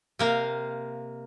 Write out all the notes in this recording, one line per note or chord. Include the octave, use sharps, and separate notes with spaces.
C3 A#3 F5